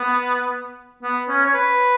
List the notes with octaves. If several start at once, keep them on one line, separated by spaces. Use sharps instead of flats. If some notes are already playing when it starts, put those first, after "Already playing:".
Already playing: B3
B3
C#4
C#5
B4